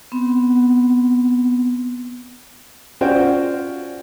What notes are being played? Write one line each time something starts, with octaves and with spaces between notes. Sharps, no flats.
B3 C4
C#4 F4 F#4 C5 D5 G5